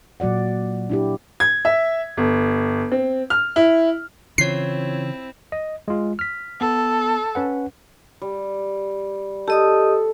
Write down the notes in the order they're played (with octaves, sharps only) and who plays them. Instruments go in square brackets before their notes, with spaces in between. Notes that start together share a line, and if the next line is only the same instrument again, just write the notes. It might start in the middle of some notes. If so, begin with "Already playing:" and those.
[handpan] A#2 F#3 F#4 D5 F#5
D4 E4 G4
[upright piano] G#6
E5
G1
C4
F6
E4
[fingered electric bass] C#3 E3 [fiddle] C4 E4 [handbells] F4 C#5 [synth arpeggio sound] C7
[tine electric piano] D#5
G#3 F4
F6 B6
[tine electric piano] B3 [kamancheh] A4
[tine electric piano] C#4 B4 F#5
[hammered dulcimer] G3
[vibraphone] G4 D#5 D#6 [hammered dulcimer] A4